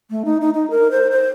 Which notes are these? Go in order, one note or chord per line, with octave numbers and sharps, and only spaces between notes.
A3
D#4
D#4
D#4
A#4
C5
C5